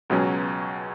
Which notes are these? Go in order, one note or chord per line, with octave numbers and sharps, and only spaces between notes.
C#2 B2 F#3 C#4